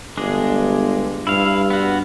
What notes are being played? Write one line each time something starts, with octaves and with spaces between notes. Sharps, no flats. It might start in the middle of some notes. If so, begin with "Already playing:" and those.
G1 G#3 D4 G#4
G2 E4 F5
B3 F#4